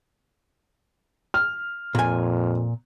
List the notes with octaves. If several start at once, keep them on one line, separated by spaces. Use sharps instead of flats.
F6
F2 A#2 G#5